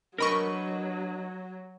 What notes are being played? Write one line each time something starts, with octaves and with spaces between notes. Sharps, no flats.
F#3 D4 A#4 B4 D#5 B5 C#6